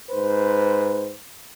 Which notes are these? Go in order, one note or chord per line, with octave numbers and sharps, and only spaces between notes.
G#2 B4 C5